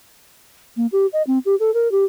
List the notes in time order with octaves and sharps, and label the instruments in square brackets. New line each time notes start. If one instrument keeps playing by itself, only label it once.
[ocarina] A#3
G4
D#5
C4
G4
A4
A#4
G4